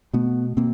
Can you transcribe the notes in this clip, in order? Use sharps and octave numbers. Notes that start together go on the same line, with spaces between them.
B2 A3 B3
B2 A#3 C4